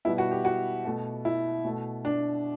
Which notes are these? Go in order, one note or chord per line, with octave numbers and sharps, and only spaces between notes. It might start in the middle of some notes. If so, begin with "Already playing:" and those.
B2 G3 B3 E4
F#4
G4
F#4
B2 A3
E4
B2 A3
D4